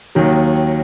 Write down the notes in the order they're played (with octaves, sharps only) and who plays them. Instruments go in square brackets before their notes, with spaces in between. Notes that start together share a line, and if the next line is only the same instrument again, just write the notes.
[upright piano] D#2 D#3 F#3